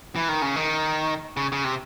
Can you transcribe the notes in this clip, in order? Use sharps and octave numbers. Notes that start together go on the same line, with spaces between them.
E3
D#3
C#3
D#3
C#3
C#3
C3